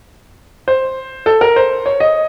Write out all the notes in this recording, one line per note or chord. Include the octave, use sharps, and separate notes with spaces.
C5
A4
A#4
C5
C#5
D#5